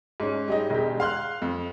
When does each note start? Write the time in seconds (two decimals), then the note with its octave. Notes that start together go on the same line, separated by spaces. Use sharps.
0.20 G#2 C#4
0.48 G3 G#3 D#4
0.70 E1 G#3 G4
1.00 F5 C6 F#6
1.42 F2